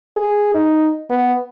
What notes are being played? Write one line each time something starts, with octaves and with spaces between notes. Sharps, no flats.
G#4
D#4
B3